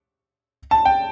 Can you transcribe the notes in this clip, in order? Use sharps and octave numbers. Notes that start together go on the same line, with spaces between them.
A5
G5